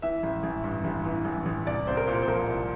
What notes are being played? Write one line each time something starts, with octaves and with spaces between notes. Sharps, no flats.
E3 E5
A1
A1
G2
A1
E3
A1
A1
C2 D5
C2 C5
A#4
A#2 C5
C5
F3 A#4
C2